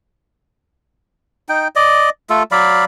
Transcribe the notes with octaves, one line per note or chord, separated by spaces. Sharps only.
D#4 G5
D5 D#5
A3 F4 A4
F#3 D5 F5 B5